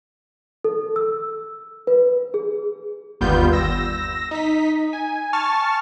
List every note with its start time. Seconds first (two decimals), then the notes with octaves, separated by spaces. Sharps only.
0.64 A4
0.96 E6
1.87 B4
2.34 G#4
3.21 G1 D#2 G3 B3 F4 G6
3.53 E6 A#6
4.31 D#4 B6
4.93 G#5
5.33 A5 C#6 F6 A6